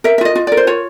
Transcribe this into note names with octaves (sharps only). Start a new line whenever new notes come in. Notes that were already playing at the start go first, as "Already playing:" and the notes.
A#4 E5
E5
F4 D#5
F4
A#4 D5
C5
F4 C#5